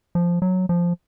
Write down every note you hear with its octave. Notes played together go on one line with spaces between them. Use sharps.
F3
F#3
F3